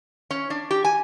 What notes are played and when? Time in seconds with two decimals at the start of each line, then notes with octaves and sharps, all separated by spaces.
0.31 C#4
0.50 D4
0.71 G4
0.84 G#5